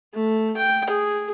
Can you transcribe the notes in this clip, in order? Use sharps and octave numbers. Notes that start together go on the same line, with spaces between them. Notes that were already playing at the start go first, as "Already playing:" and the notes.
A3
G5
G#4